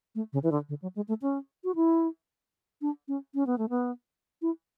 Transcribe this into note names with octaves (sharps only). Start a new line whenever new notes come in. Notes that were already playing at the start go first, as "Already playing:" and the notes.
A3
C#3
E3
D3
D3
F#3
G#3
A3
C#4
F#4
E4
D4
C#4
C#4
B3
A3
B3
E4